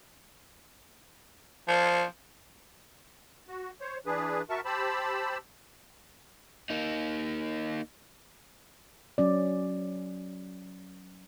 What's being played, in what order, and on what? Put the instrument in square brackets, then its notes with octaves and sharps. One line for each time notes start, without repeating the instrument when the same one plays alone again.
[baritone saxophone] F3
[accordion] F#4
C5 C#5
E3 D4 G#4 B4
F#4 A#4 E5 A5 C#6
G4 C5 A5 B5 E6
[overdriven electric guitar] A#3 D#4
[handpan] F#3 C#4 D5